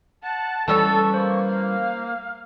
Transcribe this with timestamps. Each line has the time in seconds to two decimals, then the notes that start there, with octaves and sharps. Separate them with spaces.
0.23 F#5 A5
0.68 E3 G3 C#4 A4 A5 C#6 E6
1.14 A#3 C5
1.49 F5